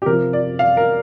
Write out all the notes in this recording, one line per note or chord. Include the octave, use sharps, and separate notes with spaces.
G4
C3 F3 A#4
D5
F5
A#4